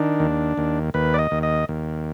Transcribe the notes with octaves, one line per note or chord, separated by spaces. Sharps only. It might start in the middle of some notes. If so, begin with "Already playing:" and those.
Already playing: D#3 D4
D#2
D#2
D#2 B4
D5
D#5
D#2
D#5
D#2